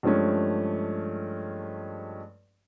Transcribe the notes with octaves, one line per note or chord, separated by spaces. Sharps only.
G2 F3 G#3 A3 C#4